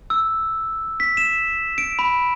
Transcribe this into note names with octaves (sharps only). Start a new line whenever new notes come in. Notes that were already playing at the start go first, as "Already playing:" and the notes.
E6
B6
E7
D7
B5